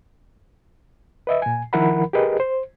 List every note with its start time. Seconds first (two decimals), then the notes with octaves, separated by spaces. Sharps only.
1.27 B4 D#5 E5
1.42 A#2 G#5
1.73 D#3 F3 E4 A#4 F#5 B5
2.13 G4 G#4 A#4 B4 D#5
2.40 C5